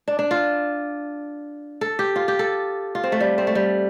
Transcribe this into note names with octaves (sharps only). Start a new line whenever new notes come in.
D4
D4
F4
A4
G4
F4
G4
A4
F4
C4
A3
G3
C4
A3
G3